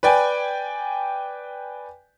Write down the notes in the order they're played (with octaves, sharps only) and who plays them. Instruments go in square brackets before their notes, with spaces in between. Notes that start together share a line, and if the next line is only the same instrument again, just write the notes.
[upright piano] B4 D5 G5 G#5